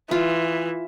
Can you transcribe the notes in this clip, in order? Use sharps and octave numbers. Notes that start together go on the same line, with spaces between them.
E3 F4